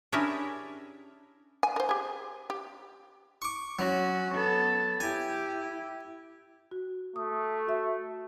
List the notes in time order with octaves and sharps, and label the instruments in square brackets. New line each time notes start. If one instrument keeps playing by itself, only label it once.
[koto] C#4 D4 E4 G4 G#4 A#4
[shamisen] G#5
A#4 C5
G4 G#4
G4
[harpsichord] C#6 D6
[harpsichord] F#3 [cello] C#4 F#4
[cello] B3 A4
[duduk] E4 [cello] G4 [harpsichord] G#5
[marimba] F#4
[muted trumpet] A3 [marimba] D#6
[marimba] F#4 E5